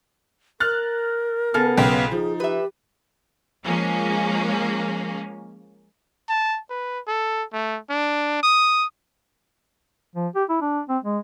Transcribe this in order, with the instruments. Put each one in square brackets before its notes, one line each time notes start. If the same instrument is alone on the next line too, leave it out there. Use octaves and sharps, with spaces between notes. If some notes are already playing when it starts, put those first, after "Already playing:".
[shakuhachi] A#4 [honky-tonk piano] F6 F#6 A6
[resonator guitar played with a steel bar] C#3 G#4 A4 [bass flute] B3 [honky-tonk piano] F6
[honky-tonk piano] B1 C#3 [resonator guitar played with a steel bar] G5
[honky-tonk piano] F3 [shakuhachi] D#4 [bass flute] G#4
[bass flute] G4 [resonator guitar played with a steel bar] B4 E5
[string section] F3 G#3 A#3 C#4
[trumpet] A5
B4
A4
A3
D4
D#6
[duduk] F3
G4
E4
D4
C4
G#3